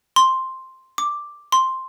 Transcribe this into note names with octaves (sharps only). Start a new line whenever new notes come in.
C6
D6
C6